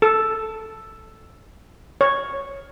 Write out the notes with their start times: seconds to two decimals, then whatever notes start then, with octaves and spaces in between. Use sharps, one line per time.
0.02 A4
2.01 C#5